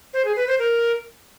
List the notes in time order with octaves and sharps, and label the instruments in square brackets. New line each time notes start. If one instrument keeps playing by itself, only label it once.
[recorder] C5
G#4
B4
C5
A#4